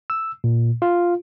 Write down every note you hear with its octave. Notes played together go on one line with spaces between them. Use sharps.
E6
A#2
F4